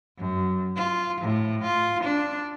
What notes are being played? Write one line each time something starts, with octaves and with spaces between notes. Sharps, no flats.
F#2
F4
A2
F4
D4